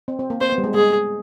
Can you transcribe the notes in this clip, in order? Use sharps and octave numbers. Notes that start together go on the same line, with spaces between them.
C4
C4
A#3
C4 C5
B3
G3
G#3
G#3 G#4